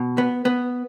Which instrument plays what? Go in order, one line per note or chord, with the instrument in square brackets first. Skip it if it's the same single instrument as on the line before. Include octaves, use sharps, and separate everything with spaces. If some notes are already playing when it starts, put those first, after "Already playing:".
Already playing: [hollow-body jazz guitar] B2
B3
B3